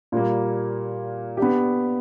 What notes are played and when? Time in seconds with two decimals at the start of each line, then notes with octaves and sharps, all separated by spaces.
0.12 A#2 G3 A#3
1.37 B3 D4 G4